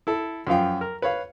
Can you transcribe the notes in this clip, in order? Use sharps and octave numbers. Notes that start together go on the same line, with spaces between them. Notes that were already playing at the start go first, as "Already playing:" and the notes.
E4 A4
F#2 F3 F4 F5 G5
A#4
B4 C#5 F5